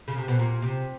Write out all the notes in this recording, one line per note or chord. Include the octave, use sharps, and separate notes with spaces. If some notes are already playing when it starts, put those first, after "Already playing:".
C#3
C3
B2
A#2
C3